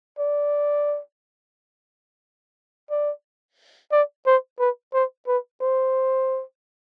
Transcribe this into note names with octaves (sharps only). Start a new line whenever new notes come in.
D5
D5
D5
C5
B4
C5
B4
C5